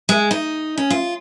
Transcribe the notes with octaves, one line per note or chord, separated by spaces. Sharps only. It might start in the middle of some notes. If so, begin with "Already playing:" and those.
G#3
D#4
C#4
F4